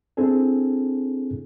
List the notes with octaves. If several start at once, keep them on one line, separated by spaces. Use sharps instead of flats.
C4 D4 E4 G#4 A4